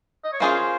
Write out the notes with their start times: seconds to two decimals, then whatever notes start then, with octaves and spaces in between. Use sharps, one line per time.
0.24 D#5
0.33 C#5
0.40 A#3 C#4 F4 G#4 C5